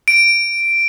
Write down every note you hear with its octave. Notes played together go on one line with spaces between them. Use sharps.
D7